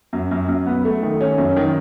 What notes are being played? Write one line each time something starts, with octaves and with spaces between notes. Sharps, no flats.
F#2
F#2
F#2
B3
A3
D#3
C#4
F#2
D#3